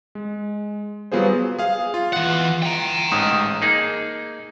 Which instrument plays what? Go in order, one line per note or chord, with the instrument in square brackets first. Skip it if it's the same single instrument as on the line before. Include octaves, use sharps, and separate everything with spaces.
[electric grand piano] G#3
F#3 G3 B3 F4 G#4 C5
G#4 F5
F4
[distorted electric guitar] E3 F#5
G5 A#5
[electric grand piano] A1 G#2 D#6
[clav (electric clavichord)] A#3 D#4 G#4